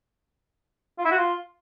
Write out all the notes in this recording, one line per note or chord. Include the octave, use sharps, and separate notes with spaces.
F4
E4
F#4
F4